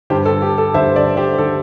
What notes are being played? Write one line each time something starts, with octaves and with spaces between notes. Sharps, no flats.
G2 D3 G4 C5
A4
G4
A4
G2 D3 C5 E5
A4 D5
G4 C5
D3 A4